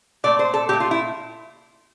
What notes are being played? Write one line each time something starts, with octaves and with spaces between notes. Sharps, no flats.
A#2 A3 D5
C5
A4
A#2 A3 G4
F4
E4